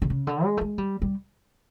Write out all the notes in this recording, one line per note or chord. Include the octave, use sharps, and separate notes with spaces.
D3
C#3
D3
G#3
A3
G#3
G3
G3